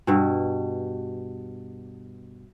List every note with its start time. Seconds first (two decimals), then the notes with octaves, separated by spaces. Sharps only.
0.07 G2 B2